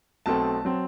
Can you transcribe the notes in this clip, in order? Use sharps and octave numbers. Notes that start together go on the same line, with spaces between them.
B1 B2 A3 C4 A5
F#3 C4